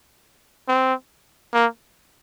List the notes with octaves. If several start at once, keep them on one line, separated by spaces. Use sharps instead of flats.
C4
A#3